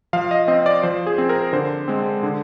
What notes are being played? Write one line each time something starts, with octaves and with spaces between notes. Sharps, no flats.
F3 F5
D#5
C4 D#5
D5
F3 C5
G#4
C4
A#4
D3 C5
G#3 C4
D3